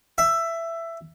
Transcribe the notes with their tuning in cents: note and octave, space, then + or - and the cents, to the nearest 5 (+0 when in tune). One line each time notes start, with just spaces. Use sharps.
E5 +15